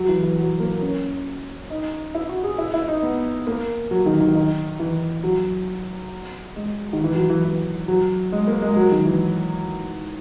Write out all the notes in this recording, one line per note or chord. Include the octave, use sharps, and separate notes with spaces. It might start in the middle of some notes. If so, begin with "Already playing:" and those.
Already playing: F#3
E3
E3
F#3
A#3
C#4
D#4
E4
F#4
G#4
E4
E4
D#4
B3
A#3
F#3
D#3
D#3
D#3
E3
F#3
G#3
D#3
E3
F#3
E3
E3
F#3
G#3
A#3
G#3
F#3
D#3
E3